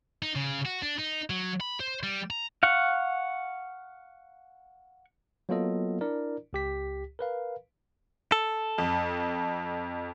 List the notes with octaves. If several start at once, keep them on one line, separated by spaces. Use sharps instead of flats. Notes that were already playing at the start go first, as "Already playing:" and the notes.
D#4
C#3
F#4
D4
D#4
F#3
B5
C5
G3
A#5
F5 F#5 C#6
F#3 A#3 B3 F4 A4 D#5
D4 E4 A#4 D5
C#2 G4 B6
A#4 B4 F5
A4
F2